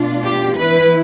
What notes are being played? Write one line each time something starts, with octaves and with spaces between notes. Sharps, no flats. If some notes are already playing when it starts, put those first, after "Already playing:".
Already playing: B2 A3 D4 F4
G4
E3 B3 E4 B4